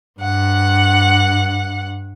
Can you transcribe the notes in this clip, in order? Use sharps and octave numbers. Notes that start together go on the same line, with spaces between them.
G2 F#5